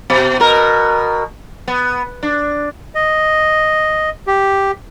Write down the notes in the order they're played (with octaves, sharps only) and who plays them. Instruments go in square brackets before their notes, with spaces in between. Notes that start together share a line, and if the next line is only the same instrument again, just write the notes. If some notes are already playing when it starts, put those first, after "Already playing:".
[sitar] B2
B2 A#4
B3
D4
[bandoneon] D#5
G4